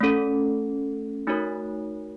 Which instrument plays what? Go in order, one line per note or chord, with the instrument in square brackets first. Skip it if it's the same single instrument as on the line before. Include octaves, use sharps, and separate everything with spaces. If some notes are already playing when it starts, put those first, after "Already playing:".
[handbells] A3 C#4 A4
A3 D#4 F#4 A#4 C#5